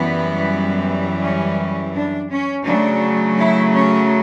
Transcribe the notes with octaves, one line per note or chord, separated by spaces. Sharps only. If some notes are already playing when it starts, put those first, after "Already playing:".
Already playing: F#2 E3 G3 B3
C#4
D4
C#4
C#3 F#3 A3 D4
E4
C#4